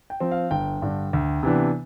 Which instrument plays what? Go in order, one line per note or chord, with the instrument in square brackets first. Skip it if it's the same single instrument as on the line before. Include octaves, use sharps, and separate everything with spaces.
[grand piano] G5
F3 C4
F5
G1 G5
G2 D3
D2
C3 E3 B3 D4